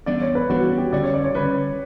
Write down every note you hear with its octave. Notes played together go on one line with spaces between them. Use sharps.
E3 G3 B3 D4 D5
C#5
B4
E3 G3 B3 D4 F#4
F#4
G4
D3 G3 C#4 D5
C#5
D5
C#5
D3 G3 C#4 B4